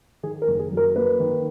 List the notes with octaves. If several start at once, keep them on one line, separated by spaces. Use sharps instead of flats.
D#3 G#4
A#4
F#1
G#4
F#2
A#4
A#3 B4
D#3